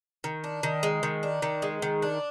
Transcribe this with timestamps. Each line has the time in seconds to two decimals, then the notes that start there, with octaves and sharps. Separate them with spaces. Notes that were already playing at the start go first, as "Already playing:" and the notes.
0.24 D#3
0.44 D4
0.63 D#3
0.83 G#3
1.03 D#3
1.23 D4
1.42 D#3
1.62 G#3
1.82 D#3
2.02 D4